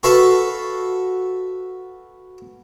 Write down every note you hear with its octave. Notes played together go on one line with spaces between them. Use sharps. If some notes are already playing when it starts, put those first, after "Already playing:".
F#4 A4 B4 E5 F5 A5